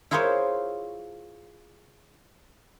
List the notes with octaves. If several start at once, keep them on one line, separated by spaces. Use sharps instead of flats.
E4 F4 G#4 A#4 C5 C#5